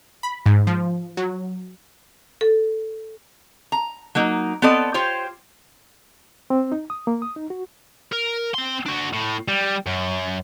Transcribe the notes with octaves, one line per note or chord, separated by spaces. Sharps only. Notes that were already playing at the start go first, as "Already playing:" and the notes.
B5
G#2
F3
F#3
A4
A#5
F#3 A#3 D#4
B3 C4 A4 D5 D#5
F4 G4 C5 C#5
C4
D#4
D#6
A#3
D#6
D#4
F#4
A#4
C4 C6
D4 F#4
A2
G3
F#2